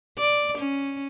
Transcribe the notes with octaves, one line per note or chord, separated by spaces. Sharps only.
D5
C#4